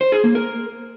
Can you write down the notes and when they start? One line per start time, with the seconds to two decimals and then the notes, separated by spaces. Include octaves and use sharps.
0.01 C5
0.12 G#4
0.24 A#3
0.35 A#4